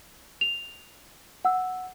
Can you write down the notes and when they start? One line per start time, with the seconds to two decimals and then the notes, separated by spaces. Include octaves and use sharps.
0.41 F7
1.45 F#5 E6